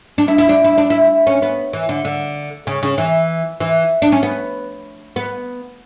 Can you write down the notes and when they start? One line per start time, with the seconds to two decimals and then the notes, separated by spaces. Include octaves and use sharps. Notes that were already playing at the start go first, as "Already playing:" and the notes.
0.18 D4
0.28 E4
0.38 E4
0.49 D4
0.64 E4
0.78 D4
0.90 E4
1.27 C#4
1.42 B3
1.73 E3
1.89 D3
2.05 D3
2.67 C#3
2.83 C#3
2.98 E3
3.60 E3
4.02 D4
4.12 C#4
4.23 B3
5.16 B3